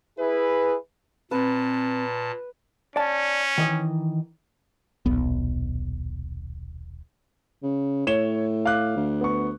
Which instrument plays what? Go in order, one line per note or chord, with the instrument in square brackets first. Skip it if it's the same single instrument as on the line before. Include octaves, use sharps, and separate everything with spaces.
[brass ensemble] E4 G#4 B4
[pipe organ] A#2 A5 [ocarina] C4 [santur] B4
[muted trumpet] C#4 [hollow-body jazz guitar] D5 A5
[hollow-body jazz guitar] D#3 E3 D#5
[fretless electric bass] D#1 B1 B3
[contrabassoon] C#3
[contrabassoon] A2 [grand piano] C#5 E7 G7
[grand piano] F5 D6 F#6
[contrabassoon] D2
[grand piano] B3 C#6